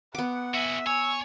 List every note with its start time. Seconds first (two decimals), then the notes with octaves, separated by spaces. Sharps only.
0.15 B3 F#5 D6
0.54 F#4 G#4 E5
0.87 C#5 G#5 E6